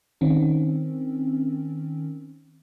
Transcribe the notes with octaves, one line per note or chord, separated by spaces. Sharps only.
D#3 C4 C#4